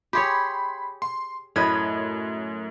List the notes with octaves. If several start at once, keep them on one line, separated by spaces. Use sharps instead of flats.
G4 G#4 C#5 B5 C6
C6
F#2 A2 B4 D#5 G#6